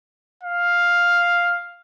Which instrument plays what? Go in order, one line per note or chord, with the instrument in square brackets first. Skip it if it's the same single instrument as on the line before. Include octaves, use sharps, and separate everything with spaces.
[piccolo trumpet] F5